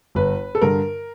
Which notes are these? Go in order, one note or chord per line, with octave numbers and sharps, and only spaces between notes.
G1 B4
A4
G2 D3 A#4